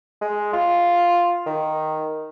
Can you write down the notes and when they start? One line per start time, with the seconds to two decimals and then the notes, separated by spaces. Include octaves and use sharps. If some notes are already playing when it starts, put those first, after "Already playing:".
0.21 G#3
0.53 F4
1.47 D#3